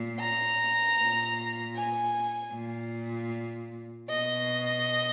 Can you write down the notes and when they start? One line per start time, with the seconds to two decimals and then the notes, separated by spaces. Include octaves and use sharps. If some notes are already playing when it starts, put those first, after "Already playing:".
Already playing: A#2
0.20 A#5
0.98 A#2
1.76 G#5
2.54 A#2
4.09 B2 D#5